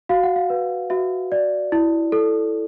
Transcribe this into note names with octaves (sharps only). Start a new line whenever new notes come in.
F#4 F5
F#5
F5
B4
F#4 E5
D5
E4
A4